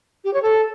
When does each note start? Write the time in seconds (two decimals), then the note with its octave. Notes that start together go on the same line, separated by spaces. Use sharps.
0.25 G4
0.34 C#5
0.43 A4